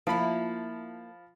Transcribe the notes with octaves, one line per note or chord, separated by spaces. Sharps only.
F3 A#3 E4 F4 A5 B5